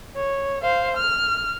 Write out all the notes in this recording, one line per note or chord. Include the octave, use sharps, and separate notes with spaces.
C#5
C5 F5
F6